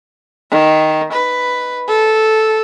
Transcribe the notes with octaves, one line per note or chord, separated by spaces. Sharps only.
D#3
B4
A4